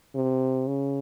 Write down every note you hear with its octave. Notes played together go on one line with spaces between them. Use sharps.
C3
C#3